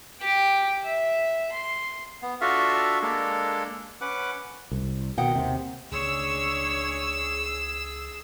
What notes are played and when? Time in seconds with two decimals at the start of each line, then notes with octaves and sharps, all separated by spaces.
0.20 G4 G5
0.83 E5
1.52 C6
2.22 B3
2.41 D4 F4 F#4 A4 E5 F5
3.02 G#3 A#3 D4 A4
4.01 C#4 B4 F#5 D6
4.71 C2
5.18 B2 D#3 F#5 G5
5.36 D#2 C3
5.91 C#2 C#3 A3 C#4 D4 G#4 C#5 E6